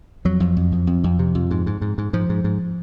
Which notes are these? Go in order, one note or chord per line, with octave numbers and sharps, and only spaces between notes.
F2 F#3
F2
F2
F2
F2
F2
C3
F2
G#2
G#2
G#2
G#2
G#2 F3
G#2
G#2